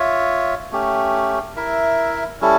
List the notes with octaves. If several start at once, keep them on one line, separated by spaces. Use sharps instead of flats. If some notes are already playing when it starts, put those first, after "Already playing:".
Already playing: F4 C#5 E5
A3 C#4 G4
E4 A#4 E5
G3 C#4 E4 A4